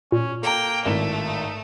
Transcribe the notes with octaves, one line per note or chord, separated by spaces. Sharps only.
A#2 C#4
A#3 A4 G5 A#5
G#1 A2 A3 E7
D#4